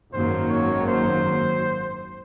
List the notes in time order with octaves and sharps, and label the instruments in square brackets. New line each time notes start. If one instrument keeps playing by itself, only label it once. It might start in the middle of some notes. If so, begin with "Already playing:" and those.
[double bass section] G#1 F#2 D#3 F#3 A#3 [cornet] C5
[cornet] C#5
C5